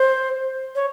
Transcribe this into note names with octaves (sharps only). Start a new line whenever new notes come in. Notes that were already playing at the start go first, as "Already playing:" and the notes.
Already playing: C5
C#5